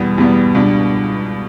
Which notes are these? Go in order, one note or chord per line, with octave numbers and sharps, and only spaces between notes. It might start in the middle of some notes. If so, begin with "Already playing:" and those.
Already playing: E2 B2 G3 B3
E2 B2 G3 B3
C#2 B2 G3 D4